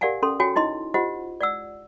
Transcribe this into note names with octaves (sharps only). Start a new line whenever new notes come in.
G4 A#4 D5 F5 F#5 G#5
C#4 A4 C6
F#4 C#5 G5 G#5
D#4 E4 D#5 C6
F4 G4 C5 D#5 F#5
D5 F#5 E6